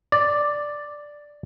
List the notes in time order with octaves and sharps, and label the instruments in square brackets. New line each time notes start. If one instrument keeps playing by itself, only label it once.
[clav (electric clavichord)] D5